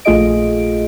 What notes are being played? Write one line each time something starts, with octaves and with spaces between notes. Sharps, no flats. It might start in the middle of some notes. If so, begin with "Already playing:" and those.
A#1 A3 F4 G#4 D#5 D7